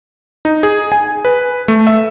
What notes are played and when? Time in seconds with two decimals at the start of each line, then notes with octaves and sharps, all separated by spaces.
0.45 D#4
0.63 G#4
0.92 G#5
1.25 B4
1.68 A3
1.87 E5